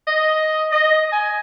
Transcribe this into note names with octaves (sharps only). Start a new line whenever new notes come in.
D#5
D#5
G#5